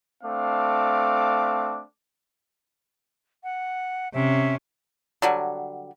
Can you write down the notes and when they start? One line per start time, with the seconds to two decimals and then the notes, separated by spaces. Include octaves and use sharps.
0.24 A3 C4 D4 F5 D6
3.44 F#5
4.13 C3 C#4 E5
5.22 D3 F#3 G3